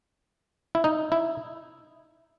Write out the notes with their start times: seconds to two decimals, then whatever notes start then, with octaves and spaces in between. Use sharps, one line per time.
0.75 E4
0.84 D#4
1.12 E4